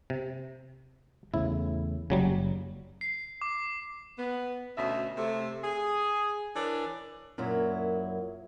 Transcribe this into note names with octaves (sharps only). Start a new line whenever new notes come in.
C3
E2 A2 C#3 E4
F#1 C#3 F#3 G3
C7
D6
B3
D2 B2 C#4 E5
C3 A3
G#4
E3 D4 A#4 C#5
F#2 A#2 F#3 E4